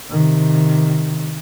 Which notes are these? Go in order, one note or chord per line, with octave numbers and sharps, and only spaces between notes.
C3 D#3